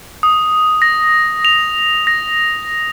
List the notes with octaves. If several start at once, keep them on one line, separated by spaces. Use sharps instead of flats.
D#6
A#6
F7
A#6